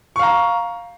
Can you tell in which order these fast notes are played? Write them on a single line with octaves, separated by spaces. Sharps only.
C#6 F5 A#5